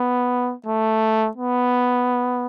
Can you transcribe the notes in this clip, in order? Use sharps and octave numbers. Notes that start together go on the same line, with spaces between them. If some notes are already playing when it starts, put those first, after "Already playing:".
Already playing: B3
A3
B3